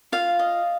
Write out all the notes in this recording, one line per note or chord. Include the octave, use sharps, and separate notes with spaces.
F4 F5
D#5